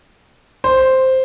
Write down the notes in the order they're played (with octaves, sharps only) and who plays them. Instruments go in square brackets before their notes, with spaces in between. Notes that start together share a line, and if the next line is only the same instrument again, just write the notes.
[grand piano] C5